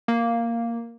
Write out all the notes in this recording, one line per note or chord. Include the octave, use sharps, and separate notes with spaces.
A#3